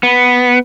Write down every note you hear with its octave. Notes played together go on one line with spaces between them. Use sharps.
B3